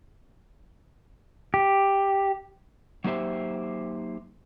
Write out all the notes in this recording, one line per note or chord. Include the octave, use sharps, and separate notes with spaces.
G4
F#3 A#3 D#4 G4 C5 E5